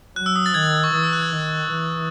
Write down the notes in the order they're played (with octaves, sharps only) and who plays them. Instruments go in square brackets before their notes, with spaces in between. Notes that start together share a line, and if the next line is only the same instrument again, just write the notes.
[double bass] F#3 [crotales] F#6
[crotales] E6
D#6
A6
[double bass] D#3 [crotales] G#6
[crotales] C#6
[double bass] E3 [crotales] D#6
[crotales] E6
F#6
G#6
[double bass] D#3
E3